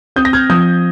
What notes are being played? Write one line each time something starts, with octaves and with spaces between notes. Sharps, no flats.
C4 D#6 G6
A#6
F6 G#6
F3 D#6 G6